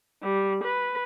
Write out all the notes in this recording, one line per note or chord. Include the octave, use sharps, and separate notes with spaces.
G3
B4